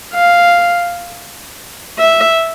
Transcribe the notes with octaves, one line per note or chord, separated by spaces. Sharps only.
F5
E5